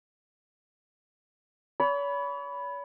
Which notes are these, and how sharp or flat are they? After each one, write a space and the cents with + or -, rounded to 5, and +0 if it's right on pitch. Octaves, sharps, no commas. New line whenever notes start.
C#5 +40 B5 +0